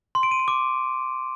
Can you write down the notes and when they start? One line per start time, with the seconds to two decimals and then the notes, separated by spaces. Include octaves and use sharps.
0.15 C6
0.23 D7
0.31 D#7
0.40 D7
0.48 D6